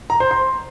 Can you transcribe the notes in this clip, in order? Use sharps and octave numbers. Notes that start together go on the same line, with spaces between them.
A#5
C5
C6